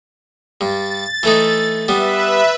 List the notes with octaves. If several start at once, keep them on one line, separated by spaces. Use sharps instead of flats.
G2 A6
E3 A3 D#4
G3 B3 B4 E5